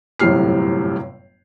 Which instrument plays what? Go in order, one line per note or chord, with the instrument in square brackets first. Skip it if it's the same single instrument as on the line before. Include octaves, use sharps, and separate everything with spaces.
[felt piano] G1 F#2 A2 C3 F6 C7